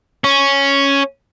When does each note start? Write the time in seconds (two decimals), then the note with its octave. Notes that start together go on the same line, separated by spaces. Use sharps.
0.24 C#4